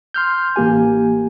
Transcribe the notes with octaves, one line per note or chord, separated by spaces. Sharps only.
C6 F6 G6
A1 A#3 G4 G#5